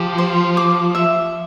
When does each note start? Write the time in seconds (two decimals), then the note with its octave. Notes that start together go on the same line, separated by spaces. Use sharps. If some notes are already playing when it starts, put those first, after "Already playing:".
Already playing: F3 G4
0.18 C5
0.57 D6
0.95 E5